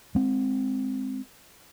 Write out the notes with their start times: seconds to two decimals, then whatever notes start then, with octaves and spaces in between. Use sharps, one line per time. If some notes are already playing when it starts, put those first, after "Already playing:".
0.15 G#3 C4